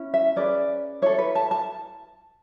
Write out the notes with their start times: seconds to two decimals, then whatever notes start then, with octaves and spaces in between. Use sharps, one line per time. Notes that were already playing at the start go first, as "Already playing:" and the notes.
Already playing: C#4 E4
0.14 E5
0.36 C#4 G#4 B4 D5
1.02 E4 A4 C#5
1.19 B4
1.35 A5
1.51 A5